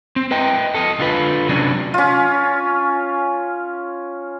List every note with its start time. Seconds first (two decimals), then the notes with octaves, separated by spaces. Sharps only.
0.16 C4
0.31 B4 D#5 G5
0.74 A4 D#5
1.00 D3 F4 B4
1.49 C3 F#3 C#4 D4
1.94 C#4 F4